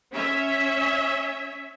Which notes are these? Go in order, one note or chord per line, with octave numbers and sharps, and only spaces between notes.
C#4 E5